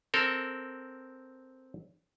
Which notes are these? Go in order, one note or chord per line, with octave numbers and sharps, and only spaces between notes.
C4 A4 A#4